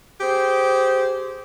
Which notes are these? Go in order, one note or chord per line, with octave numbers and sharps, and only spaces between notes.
G4 G#4 C5